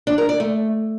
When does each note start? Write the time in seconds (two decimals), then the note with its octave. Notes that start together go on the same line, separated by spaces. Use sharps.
0.07 D4
0.18 A#4
0.29 D5
0.40 A3